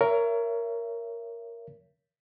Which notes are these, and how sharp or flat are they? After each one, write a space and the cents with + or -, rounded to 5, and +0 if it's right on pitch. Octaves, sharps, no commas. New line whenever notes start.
A#4 +0 C#5 +20 E5 +35